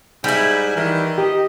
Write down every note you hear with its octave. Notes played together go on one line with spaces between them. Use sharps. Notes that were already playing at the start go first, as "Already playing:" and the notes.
G#2 G3 E4
D#3 E3
D#4 G4 D#5